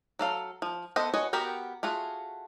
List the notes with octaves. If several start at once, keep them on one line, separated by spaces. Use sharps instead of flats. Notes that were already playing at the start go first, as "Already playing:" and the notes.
F#3 A4 F5
F3
B3 A4 C5 D#5
F#4 B4 C#5 D#5 G#5
B3 F#4 G4 A#4 G5
A3 F4 F#4 G#4